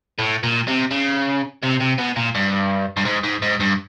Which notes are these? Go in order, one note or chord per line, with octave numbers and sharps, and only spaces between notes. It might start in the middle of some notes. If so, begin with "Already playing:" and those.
A2
A#2
C3
C#3
C3
C3
B2
A#2
G2
G2
G#2
G#2
G#2
G2